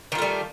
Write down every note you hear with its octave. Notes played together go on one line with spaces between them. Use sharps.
D#3 G3 A3 F4